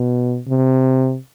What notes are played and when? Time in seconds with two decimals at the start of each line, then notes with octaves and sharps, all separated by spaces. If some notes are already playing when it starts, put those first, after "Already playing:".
Already playing: B2
0.48 C3